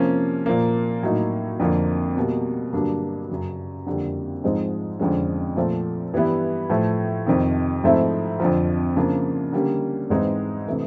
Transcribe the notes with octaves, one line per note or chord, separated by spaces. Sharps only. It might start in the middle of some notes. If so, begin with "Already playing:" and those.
Already playing: C3 F3 A#3 C#4
A#2 F3 A#3
A2 F#3 A#3 D#4
F2 D3 F3 A#3
B2 G3 A#3
G2 D3 F#3 A#3 D4
F#2 C#3 F#3
F2 D3 G3 A#3
G#2 F3 G#3 C4 D#4
F2 D3 F3 G#3 C#4
A#2 F3 A3 C4
G2 E3 G3 B3 E4
A2 F3 A3
F2 C3 D#3
G#2 F3 A3 C4 E4
F2 D3 F3
C#3 F3 A#3 D4
D3 G3 A#3 C#4
G#2 E3 G#3 C4 D#4
C3 E3 A3 D4